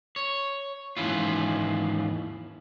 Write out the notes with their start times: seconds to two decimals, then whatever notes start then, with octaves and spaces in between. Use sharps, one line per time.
0.16 C#5
0.97 D#2 G#2 E3 C#4 E4 F4